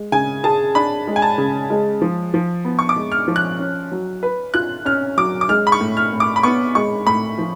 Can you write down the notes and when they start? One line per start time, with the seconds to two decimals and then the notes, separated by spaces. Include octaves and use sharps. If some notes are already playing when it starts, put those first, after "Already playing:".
Already playing: G#3
0.12 C#3 G#5
0.44 G#4 A5
0.75 D4 B5
1.07 G#3
1.16 G#5
1.22 A5
1.38 C#3
1.70 G#3
2.02 F3
2.34 F3
2.65 B3
2.79 C#6
2.89 D6
2.96 G#3
3.12 F6
3.28 F3
3.36 F#6
3.59 C#4
3.92 F#3
4.23 B4
4.54 F4 F#6
4.85 C#4 F6
5.17 F#3 D6
5.41 D6
5.49 G#3 F6
5.67 B5
5.72 C#6
5.81 A2
5.97 F6
6.12 A2
6.20 D6
6.36 B5
6.43 B3 C#6
6.75 G#3 C#6
7.06 A2 B5
7.38 F3